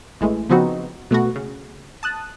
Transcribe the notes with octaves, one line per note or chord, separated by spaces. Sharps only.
A1 E3 G#3 A3
C#3 F3 B3 C4 D#4 F#4
B2 A3 B3 F#4
C#3
A5 D#6 F#6